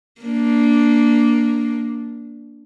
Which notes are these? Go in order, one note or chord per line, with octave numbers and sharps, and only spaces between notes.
A#3 D4